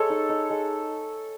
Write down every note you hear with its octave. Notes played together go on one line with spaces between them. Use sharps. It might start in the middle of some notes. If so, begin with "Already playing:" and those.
Already playing: G#3 A4 C#5
D#4
D#4
G#3